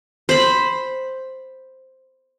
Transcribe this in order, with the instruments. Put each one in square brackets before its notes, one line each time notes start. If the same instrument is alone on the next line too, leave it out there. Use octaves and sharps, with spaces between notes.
[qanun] C5 B5